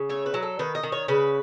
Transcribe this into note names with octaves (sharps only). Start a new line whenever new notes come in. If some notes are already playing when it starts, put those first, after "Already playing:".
Already playing: C#3
A3 C#5
B4
F#3
A4
D#3 B4
D#5
D#3
C#5
C#3 B4